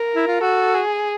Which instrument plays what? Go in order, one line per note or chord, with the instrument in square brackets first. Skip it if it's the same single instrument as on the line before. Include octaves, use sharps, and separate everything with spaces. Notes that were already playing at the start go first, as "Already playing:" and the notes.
Already playing: [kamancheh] A#4
[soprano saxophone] E4
F4
[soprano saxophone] F#4 [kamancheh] A4
[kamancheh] G#4